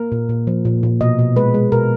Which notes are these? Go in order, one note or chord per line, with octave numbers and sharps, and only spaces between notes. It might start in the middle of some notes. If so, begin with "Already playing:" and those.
Already playing: A#3 A#4
A#2
A#2
F3
A#2
A#2
B2 D#5
B2
G#3 B4
G#3
B2 A#4